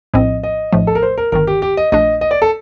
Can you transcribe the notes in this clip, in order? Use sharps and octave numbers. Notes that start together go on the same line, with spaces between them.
A#1 A2 F3 C4 D#5
D#5
A#1 A2 F3 A3
A4
A#4
C5
A#4
G1 G2 D#3 A#4
G4
G4
D#5
A#1 A#2 A3 D4 D#5
D#5
D5
A4